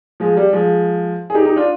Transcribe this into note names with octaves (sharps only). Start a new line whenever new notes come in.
F3 G#3
G3
F3 G#3
G#4
D#4 G4
D#4 G4
D4 F4